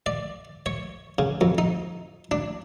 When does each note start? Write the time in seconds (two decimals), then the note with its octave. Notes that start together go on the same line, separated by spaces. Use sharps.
0.06 D5
0.66 C#5
1.18 C#3
1.41 F2
1.58 D#4
2.31 D4